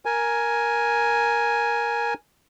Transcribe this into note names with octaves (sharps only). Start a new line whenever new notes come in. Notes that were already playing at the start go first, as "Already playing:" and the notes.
A#4 G#5